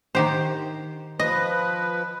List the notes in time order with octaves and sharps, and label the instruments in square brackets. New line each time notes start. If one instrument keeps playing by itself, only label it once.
[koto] D#3 G4 C5
[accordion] F3 B4 [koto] D#5